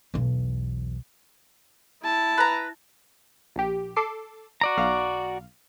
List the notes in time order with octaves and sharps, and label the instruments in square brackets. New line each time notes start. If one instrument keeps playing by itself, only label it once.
[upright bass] B1 E2
[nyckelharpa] E4 A5
[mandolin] B4 A#5
[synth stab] A#1 G4
A4 D6 C7
[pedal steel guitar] F#4 D5 A#5
[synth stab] B1 F5